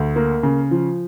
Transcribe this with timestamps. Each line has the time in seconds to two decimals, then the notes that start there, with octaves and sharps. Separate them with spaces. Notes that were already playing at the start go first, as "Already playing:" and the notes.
Already playing: D2
0.16 A#3
0.43 C#3
0.71 F3